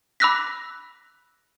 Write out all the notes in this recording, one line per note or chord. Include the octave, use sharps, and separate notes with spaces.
B5 D6 E6 F#6 A#6 B6